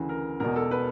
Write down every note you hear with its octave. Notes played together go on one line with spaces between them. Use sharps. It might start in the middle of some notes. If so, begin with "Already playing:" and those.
Already playing: D2 C#3 E3
A#4
E1 E2 B2 A#4
A4
B4